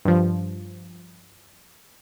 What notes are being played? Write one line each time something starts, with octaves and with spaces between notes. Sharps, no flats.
G2 F3